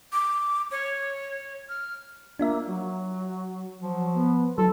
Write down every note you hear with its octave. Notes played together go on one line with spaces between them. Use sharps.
D6
C#5
F6
A#3 D4 F4 E5
F#3
F3 F#3
B3
F#3 E4 A4